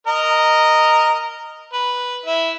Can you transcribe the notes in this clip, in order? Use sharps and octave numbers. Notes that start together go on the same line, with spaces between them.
A#4 D#5 A#5
B4
E4